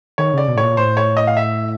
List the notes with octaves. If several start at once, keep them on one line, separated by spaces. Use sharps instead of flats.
D#3 C#5
C#3 D5
B2
A2 C#5
A#2
A2 C5
C#5
D#5
F5
E5